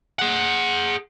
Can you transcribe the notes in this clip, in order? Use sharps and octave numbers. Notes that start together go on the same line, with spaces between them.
G#4 F#5